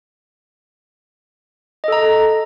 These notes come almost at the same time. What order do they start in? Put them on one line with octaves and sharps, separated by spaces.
D#5 A4 A#5